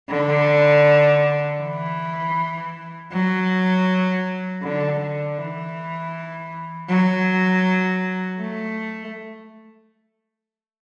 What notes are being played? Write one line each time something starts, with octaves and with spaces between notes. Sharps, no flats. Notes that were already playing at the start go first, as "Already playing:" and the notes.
D3
E3
F#3
D3
D3
E3
F#3
A3